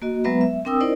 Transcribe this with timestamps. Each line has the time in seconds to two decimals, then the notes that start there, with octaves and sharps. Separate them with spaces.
0.02 A#3 F#4 D#5
0.24 F#3 G#3 B3 B4 E5 A#5
0.41 E5
0.65 C4 D4 A#4 G5 D#6 E6
0.80 D#4 E4 A#4 C5 D5 D#5